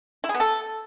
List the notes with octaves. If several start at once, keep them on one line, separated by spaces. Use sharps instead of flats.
E4
G#4
B3
A4